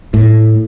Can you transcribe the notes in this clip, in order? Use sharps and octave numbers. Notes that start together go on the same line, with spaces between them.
A2